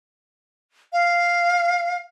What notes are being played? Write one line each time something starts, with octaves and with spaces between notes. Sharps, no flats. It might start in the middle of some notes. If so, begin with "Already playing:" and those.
F5